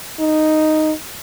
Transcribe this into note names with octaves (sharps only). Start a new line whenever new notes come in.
D#4